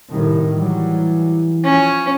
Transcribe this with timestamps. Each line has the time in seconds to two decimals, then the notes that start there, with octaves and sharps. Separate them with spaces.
0.13 C2 A2 D#3
0.54 E3 F#3 G3
1.65 F3 C#4